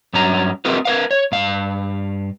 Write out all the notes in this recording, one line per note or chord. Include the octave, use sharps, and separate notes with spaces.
G2 F#3 C#4 A#5
C4 F#4 G#4 A#4 B4
A#4 B4 F5
C#5
G2 F5